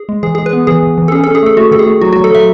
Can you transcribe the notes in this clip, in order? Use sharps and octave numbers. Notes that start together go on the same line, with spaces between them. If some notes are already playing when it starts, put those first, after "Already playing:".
Already playing: G#4
G#3
E3 G#4
G#3 G#4
B4
B3
E3 G#4
E3
E3
A4
C#4 G#4
C#4 A4
G#4
A3 A4
A3 F#4
D#3 A4
G#4
A3
F#3 F#4
F#3 F#4
A4
F#3 E5